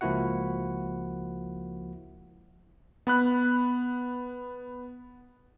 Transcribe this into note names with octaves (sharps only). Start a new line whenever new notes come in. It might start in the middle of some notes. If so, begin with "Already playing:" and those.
C#2 F3 A#3 E4 F#4 F#5
B3 B5 F#6